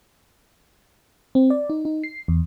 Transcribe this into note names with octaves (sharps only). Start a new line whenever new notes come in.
C4
D5
D#4
D#4
C7
E2